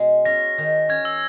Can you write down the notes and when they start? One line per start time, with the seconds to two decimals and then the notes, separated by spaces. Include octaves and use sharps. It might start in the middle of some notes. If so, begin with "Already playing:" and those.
Already playing: B2 G#3
0.25 C#4 A#6
0.58 D#3
0.89 C#4 G#6
1.05 E6